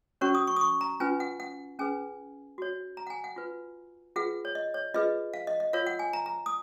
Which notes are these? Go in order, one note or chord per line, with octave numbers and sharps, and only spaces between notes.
C#4 F#4 A#4 C#5 C#6
D#6
C#6
D#6
C#6
A#5
C#4 F4 B4 G#5
F#5
F#5
C#4 G#4 B4 G#5
F#4 C#5
A#5
F#5
G#5
F#5
F4 B4
F4 G#4 B4 F#5
C#5
D#5
C#5
F4 G#4 B4 D#5
F5
D#5
D#5
F4 A#4 C#5 F5
F#5
G#5
A#5
A#5
D#6